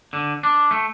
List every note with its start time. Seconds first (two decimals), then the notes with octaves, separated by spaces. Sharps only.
0.13 D3
0.43 D4
0.71 A3